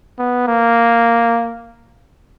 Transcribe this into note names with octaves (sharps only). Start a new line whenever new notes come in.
B3
A#3